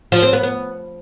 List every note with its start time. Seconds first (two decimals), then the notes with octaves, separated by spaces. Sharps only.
0.12 F3
0.23 C4
0.33 B3
0.43 B3